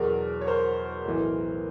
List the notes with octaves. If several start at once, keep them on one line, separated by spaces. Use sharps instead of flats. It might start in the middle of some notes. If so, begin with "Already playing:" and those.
Already playing: E2 B2 F#3 G#4 A#4
C#5
A#4 C5
B1 A2 E3